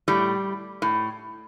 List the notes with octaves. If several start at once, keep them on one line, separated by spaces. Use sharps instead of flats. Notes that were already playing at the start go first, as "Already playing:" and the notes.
A2 G3
A2